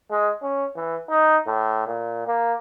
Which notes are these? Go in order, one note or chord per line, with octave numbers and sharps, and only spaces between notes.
G#3
C#4
E3
D#4
A2
A#2
A#3